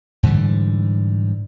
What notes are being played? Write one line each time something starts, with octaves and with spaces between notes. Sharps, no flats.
G#2 D3 E3 G3